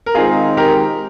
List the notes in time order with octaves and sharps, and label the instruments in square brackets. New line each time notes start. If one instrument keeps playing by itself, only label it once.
[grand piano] A#4
[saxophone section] D#3 G#3 C4 D#4 [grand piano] F4 G#4
[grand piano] G4 A#4